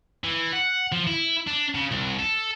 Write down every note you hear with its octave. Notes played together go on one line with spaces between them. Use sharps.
E3
F#5
F3
E4
D4
C#3
C2
A4